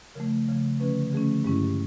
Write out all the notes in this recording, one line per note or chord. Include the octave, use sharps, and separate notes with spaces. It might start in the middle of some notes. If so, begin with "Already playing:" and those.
C#3 F3 A3 A#4
C#3 F3 A3
D3 F3 A3 C#4 B4
D3 F3 A3 C#4 G#4
G2 D#3 G#3 C#4 E4 G4